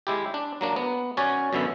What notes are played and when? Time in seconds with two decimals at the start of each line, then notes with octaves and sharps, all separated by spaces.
0.07 G#3 E4 G4
0.34 D4
0.61 F#3 A#3 D4
0.76 B3
1.17 C#4 F#4 C#5 D5 G#5
1.53 F#2 B2 D3 B3 E5